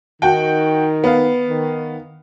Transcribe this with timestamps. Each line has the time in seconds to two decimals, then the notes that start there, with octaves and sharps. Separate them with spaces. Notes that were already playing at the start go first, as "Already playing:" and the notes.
0.22 D#3 F#4 G5
1.04 B3 F5
1.47 D#3